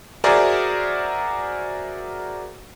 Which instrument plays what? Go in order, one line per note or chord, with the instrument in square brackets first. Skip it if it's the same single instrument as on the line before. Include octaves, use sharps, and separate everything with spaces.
[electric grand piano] F#4 G#4 A#4 C5 D5 E5